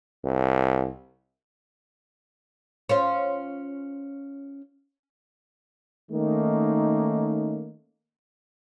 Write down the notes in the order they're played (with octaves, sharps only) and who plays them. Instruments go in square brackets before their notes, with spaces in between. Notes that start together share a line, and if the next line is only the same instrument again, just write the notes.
[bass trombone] C2
[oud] C#4 F4 C5
[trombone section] D#3 A3 A#3 C#4 D#4